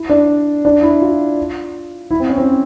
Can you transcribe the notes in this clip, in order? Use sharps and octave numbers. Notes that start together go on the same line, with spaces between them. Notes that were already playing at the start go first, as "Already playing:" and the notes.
Already playing: E4
D4
D4
E4
F4
E4
C4
C#4
C4